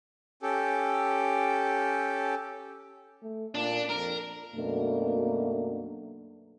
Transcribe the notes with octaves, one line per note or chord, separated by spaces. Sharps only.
C#4 G4 A4
A3
A#2 D4
F2 A#4
F#2 B2 A3 A#3 D4